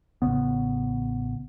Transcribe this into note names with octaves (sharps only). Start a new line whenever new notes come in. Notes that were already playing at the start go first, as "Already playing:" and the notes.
A1 C#3 B3